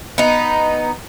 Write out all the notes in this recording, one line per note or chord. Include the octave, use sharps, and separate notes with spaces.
B3 D#4